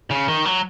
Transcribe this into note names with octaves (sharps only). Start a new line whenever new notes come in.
C#3
D#3
F#3